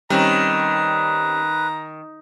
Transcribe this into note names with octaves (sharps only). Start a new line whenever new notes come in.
D#3 G3 C4 C#4 B4 A#5